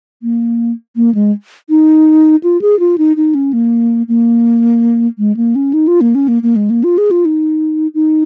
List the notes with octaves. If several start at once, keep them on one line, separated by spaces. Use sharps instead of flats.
A#3
A#3
G#3
D#4
F4
G#4
F4
D#4
D#4
C#4
A#3
A#3
G#3
A#3
C#4
D#4
F4
A#3
C#4
A#3
A#3
G#3
A#3
F4
G#4
F4
D#4
D#4